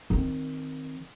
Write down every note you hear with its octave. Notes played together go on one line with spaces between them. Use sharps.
D#3 C4